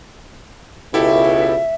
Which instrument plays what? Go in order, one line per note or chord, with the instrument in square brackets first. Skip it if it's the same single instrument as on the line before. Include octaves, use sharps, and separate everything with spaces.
[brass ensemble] C#2 B2 [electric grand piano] E4 G4 A4 [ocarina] E5